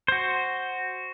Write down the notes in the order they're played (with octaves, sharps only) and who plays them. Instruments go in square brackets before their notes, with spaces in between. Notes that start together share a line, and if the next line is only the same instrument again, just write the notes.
[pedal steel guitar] F#4 C5